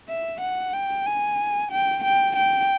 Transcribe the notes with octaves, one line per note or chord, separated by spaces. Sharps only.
E5
F#5
G5
G#5
G5
G5
G5